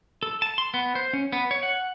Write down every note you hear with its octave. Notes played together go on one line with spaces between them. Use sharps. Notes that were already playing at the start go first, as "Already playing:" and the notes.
A4
A5
C6
B3
C5
C#4
B3
C#5
F#5